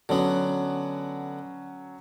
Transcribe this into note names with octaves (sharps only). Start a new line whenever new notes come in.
D3 F#3 B3 C#4